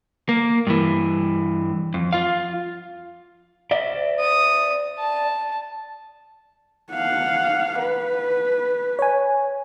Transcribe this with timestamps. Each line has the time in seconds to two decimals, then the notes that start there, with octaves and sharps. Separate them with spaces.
0.29 A#3
0.67 G2 E3
1.94 F2
2.13 F4 F5
3.71 D5 E5
4.20 D#6
4.99 A5
6.92 F5 F#5
7.80 B4
8.99 C#5 G#5